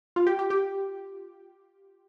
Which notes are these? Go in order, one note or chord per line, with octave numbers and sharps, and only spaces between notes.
F4
G4
G4
G4